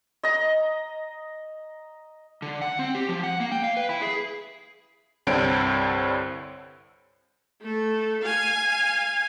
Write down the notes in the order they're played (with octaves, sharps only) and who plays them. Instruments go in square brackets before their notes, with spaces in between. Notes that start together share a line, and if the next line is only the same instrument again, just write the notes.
[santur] D#5 A#5
[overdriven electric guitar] D3
F#5
C4
G4
F3
F#5
A#3
G5
F5
B4
E4
G#4
[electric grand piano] C2 G2 D3 C4 C#5 D7
[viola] A3 A4
F5 G#5